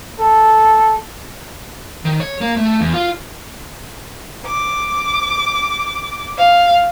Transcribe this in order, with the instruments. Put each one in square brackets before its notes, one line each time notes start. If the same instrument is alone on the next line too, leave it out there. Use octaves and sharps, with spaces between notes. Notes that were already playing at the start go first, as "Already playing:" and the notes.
[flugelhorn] A4
[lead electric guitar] D#3
C#5
A#3
A3
E2
F4
[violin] D6
F5